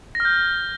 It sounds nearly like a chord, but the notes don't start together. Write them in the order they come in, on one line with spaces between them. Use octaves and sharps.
A#6 F6 G6